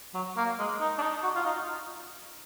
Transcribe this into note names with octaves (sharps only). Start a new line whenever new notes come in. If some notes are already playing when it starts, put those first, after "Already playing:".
F#3
A#3
G#3
D#4
D4
D#4
F#4
F4
D#4